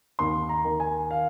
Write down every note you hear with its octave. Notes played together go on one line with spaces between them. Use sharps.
D#2 C6
A#5
D#3
G#5
F5